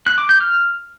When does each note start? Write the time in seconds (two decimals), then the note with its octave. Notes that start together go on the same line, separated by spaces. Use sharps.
0.07 F#6
0.18 D6
0.29 G6
0.40 F6